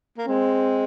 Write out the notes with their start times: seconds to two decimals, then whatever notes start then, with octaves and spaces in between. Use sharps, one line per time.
0.18 A#3
0.27 G#3 C4